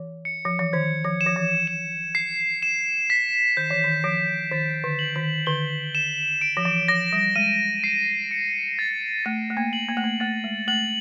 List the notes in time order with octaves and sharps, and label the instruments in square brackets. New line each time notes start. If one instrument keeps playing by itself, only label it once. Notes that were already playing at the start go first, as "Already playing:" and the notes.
Already playing: [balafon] E3
[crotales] C#7
[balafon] F3
E3
[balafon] D#3 [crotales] G#6
[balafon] F3
[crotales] E7
[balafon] F3
E3
[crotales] E7
C7
E7
B6
[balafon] D#3 [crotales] G6
[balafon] E3
D#3
[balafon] F3 [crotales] D7
[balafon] D#3 [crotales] A6
[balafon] D3
[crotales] F#7
[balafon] D#3
[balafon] D3 [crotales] G7
[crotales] E7
D7
[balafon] F3
E3
[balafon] F3 [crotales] A#6
[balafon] G3
[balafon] G#3 [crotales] D#7
[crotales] C7
C#7
A6
[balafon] A3 [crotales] A6
[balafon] A3
A#3
[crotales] F#7
[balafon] A#3
A3
A#3
[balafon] A3 [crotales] A6
[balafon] G#3
[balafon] A3 [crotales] F#7